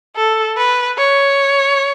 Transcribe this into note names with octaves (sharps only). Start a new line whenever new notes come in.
A4
B4
C#5